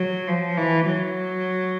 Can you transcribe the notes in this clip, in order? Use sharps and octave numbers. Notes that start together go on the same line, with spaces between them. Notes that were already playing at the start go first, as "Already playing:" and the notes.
Already playing: F#3
F3
E3
F#3